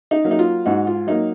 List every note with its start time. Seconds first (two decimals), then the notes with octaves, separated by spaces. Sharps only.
0.11 D#4
0.24 F#3 A#3
0.31 D#4
0.39 F4
0.66 G#2 D#4 F#4
0.87 F4
1.07 F#3 A#3 D#4